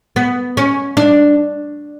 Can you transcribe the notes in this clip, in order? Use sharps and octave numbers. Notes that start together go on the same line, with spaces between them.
B3
C#4
D4